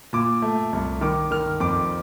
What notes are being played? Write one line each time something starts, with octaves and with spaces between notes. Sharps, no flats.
A#2 D6
A3
C2
D#3 D6
D#3 F6
F2 D6